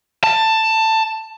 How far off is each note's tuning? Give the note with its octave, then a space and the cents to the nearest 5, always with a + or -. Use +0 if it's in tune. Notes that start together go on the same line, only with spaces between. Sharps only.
A5 +15